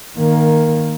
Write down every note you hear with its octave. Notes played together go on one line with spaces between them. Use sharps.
D#3 A#3